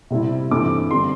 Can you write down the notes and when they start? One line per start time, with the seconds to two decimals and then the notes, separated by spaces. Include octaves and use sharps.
0.10 C3 G3 C4 E4
0.51 G2 E3 A3 C4 D6
0.91 D3 G3 C4 C6